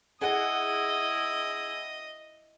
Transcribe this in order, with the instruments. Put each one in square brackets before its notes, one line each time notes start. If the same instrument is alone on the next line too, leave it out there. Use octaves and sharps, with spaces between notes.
[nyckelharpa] E4 D#6 [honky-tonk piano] G#4 F#5 [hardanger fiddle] D#5